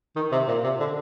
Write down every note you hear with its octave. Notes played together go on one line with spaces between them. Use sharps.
D#3
C3
A#2
C3
D3